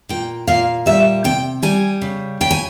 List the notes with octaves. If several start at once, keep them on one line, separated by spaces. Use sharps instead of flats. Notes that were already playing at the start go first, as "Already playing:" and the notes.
A#2 G5
A#2 F5
G3 E5
C3 G5
G3 G#5
C#3
C#3 G5
G#5